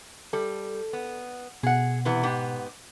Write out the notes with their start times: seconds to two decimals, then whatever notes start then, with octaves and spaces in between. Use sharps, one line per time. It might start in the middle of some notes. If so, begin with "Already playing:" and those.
0.33 G3 A4
0.93 B3
1.63 B2 G#4 F#5
2.05 C3 E3 B3
2.23 G#2 B3 G4